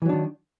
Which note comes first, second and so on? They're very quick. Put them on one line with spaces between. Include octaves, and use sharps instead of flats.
E3 F#3 D4 D#3